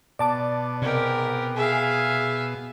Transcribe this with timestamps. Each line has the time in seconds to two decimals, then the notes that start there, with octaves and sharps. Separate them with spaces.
0.19 B2 D5 A5 D6
0.82 G#2 C3 G4 A#4
1.56 G#4 E5 F5